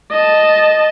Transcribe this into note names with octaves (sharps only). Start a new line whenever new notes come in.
D#5 A5